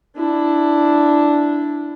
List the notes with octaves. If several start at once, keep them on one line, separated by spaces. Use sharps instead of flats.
D4 E4